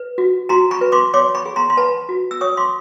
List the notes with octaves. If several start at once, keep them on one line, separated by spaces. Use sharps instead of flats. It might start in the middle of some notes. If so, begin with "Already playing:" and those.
Already playing: B4
F#4
F#4 A#5 C6
B5 C#6
B4
C6 D6
C#5 C6 D6
B5 C#6
G#4
A#5 C6
C6
B4 A5 B5
F#4
E6
C#5 C#6 D#6
C6 D6